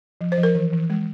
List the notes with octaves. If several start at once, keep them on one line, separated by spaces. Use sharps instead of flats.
F3
C5
F3
A#4
E3
E3
G#3